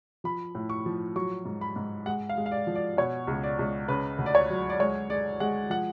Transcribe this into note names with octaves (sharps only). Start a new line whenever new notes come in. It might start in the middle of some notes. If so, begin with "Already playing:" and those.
F3 B5
A2
C#6
F3
F#3 C#6
G#2
B5
G#2
G#3 F#5
F5
G#3
F5
D5
F3
D5
B2 C#5
C#2
D5
C#2
C#3 B4
D2
D5
C#5
F#3
D5
G#3 C#5
G#3 D5
G#3 F#5
F3 F#5